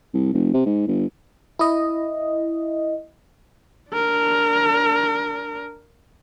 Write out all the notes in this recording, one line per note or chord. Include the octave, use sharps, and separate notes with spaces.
C2
F1
C3
G#2
G1
E4 D#5
D4 A#4